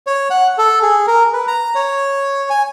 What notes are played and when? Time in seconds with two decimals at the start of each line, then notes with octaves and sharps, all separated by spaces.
0.07 C#5
0.30 F#5
0.58 A4
0.82 G#4
1.07 A#4
1.33 B4
1.48 A#5
1.75 C#5
2.50 G#5